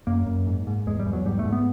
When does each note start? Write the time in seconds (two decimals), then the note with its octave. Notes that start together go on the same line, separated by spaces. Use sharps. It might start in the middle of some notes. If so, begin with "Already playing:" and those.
0.07 F#2 A#3
0.26 F#2
0.47 G#2
0.67 G#2
0.87 E2 G#3
1.00 G3
1.06 E2
1.13 F#3
1.25 G#2 G3
1.39 A3
1.45 G#2
1.52 B3